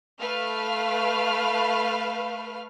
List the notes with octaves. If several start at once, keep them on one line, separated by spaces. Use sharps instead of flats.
A3 B4 F5 F6